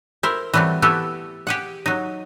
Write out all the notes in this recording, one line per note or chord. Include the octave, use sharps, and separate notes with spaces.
E4 A#4 C5
E3 F#3 G3 A3 C4
E3 A3 B3 E4 G4 A4
G4 G#4 F#5
F#3 D#4